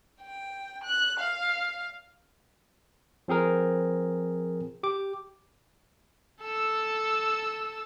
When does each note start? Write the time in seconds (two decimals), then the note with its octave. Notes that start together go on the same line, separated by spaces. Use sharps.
0.22 G5
0.84 F#6
1.19 F5
3.28 F3 C4 G#4 A#4
4.83 G4 D6
6.42 A4 E6